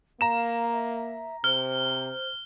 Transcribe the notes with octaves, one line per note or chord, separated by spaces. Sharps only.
A#3 F5 A#5 E7
E5
C3 C5 F6